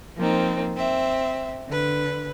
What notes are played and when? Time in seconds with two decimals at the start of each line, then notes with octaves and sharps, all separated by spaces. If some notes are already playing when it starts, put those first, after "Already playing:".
0.16 F3 A#3 C4 D#4
0.75 C4 E5
1.68 D3 B4